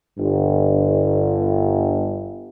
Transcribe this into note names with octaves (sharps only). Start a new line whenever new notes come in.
G1 G2